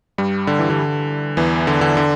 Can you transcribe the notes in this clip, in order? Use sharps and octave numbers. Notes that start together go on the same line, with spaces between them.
G2 G3
D3
E3
D3
E2 E3
D3
D3
D3